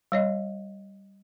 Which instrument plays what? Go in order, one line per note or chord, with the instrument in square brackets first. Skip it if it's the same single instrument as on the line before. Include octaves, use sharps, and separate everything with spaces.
[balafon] G3 C#5 D#5